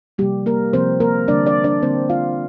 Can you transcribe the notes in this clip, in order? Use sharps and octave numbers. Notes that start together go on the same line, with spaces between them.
C3 F3 G3 A#3 G4
A#3 A#4
C3 F3 A#3 C4 C5
A#3 A#4
D3 G3 A#3 D4 D5
D4 D5
D4 D5
D3 G3 A#3 C4 C5
F4 F5